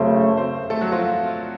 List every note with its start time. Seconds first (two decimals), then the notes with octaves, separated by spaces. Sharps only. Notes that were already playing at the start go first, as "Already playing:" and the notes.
Already playing: F#2 C#3 A3 A#3 C4 C5
0.37 C4 C5
0.70 A3 A4
0.81 F#3 F#4
0.92 F3 F4